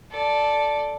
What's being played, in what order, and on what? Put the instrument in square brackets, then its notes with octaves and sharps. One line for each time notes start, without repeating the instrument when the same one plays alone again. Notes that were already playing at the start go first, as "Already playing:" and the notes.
[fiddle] A4 D5